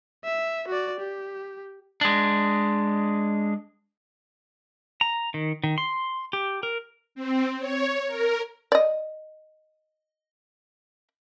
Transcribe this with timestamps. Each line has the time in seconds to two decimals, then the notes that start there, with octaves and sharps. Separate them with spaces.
0.25 E5
0.68 F#4 D5
1.00 G4
2.01 G#3 D4
5.01 A#5
5.34 D#3
5.64 D#3
5.78 C6
6.33 G4
6.63 A#4
7.15 C4
7.59 C#5
8.08 A#4
8.72 D5 D#5